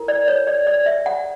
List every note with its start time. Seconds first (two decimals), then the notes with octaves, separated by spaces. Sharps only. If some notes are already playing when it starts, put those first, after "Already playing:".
Already playing: E4 A#4
0.08 D5
0.28 C#5
0.47 D5
0.67 D5
0.86 E5
1.06 F#5